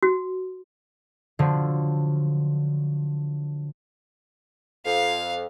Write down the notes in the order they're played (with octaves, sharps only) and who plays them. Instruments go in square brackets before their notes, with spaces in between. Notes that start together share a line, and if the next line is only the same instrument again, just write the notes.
[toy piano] F#4
[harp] D3 F3 F#3
[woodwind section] F2 [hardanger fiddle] F5